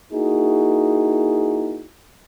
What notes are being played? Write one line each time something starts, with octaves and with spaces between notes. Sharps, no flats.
A#3 D#4 E4 F#4 G#4